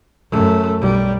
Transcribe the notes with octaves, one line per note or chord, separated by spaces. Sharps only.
F#2 A3
B1 G3